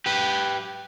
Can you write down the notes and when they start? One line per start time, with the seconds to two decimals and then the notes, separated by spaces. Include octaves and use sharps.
0.06 G4 B4